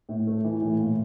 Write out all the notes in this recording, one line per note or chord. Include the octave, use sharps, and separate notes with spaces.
A2
A3
E3
A2
A#2